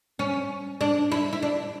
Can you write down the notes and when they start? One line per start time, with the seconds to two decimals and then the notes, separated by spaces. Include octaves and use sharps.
0.19 C#4
0.81 D4
1.12 E4
1.33 E4
1.42 D4